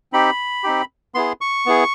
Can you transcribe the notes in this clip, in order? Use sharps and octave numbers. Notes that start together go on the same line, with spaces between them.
C4 D#4 G4 B5
C4 D#4 G4
B3 E4 G#4 C6
C#6
B3 E4 G#4